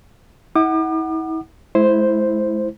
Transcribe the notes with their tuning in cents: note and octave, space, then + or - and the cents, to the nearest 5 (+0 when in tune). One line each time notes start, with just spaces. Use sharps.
E4 -40 F#5 +10 D6 +45
G#3 +40 E4 +0 C5 +0